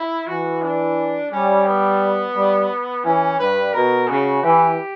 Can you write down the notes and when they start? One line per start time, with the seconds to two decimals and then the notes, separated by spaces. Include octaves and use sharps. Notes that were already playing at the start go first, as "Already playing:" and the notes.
Already playing: E4
0.27 E3 F#4
0.62 D4
1.31 G3 C#4
1.66 B3
2.34 G3
3.04 E3 C#4
3.39 G2 B4
3.73 B2 A#4
4.08 C#3 F#4
4.43 E3 G4